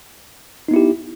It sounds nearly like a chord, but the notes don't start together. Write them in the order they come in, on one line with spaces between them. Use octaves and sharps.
D#4 B3 E4 G4